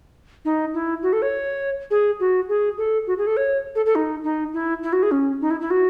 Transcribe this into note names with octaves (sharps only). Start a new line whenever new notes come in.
D#4
E4
F#4
A4
C#5
G#4
F#4
G#4
A4
F#4
G#4
A4
C#5
A4
A4
D#4
D#4
E4
E4
F#4
G#4
C#4
D#4
E4
E4
F#4